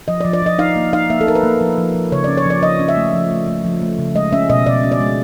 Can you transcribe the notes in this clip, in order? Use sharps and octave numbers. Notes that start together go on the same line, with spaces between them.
F3 D#5
D5
F3
D5
F3 D#5
D#4 F5
A#3
D#4 F5
A#3 E5
A4
D#4 A#4
B4
A#3
F3
F3
F3
C#3 C#5
C#4 D5
C#5
F3 D5
F3 D#5
C#4
E5
A3
F3
A3
A3
F3
A3
C#3
G#3 D#5
C#4 E5
B2 D#5
B2 D5
C#4
D5
G#3